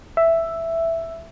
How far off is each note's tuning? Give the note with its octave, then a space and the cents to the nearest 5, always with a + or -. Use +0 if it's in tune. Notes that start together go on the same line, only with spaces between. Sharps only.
E5 +5